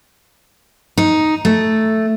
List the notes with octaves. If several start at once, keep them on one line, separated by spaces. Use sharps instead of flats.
D#4
A3